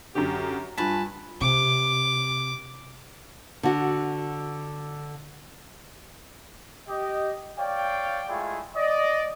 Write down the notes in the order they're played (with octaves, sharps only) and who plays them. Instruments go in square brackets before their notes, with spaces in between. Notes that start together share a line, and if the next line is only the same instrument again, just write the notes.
[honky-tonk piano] F#2 D3 [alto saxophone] G4
[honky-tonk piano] G2 [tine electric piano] G3 F4 B6 [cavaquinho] B4 G#5 [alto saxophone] A5
[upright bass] C3 [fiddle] D6
[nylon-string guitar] D3 F#4
[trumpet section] G4 D#5
C#5 D5 F5 G5
G#3 A3 E4 F4 G#4
D5 D#5